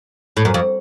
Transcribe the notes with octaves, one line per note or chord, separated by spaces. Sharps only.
A2
F#2
F2